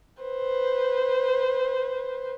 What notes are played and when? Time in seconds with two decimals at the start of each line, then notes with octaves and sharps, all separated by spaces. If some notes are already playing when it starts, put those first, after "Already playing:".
0.22 B4 C5